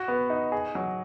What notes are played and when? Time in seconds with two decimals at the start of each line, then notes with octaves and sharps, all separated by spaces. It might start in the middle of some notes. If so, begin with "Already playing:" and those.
Already playing: F#4
0.08 B3
0.30 D#4
0.52 G#4
0.75 F#3